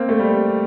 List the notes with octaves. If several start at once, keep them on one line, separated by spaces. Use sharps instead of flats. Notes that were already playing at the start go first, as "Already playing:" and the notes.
Already playing: A#3 C4
A3
G3